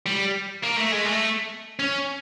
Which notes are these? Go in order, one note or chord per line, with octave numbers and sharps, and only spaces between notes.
G3
A#3
A3
G#3
A3
C#4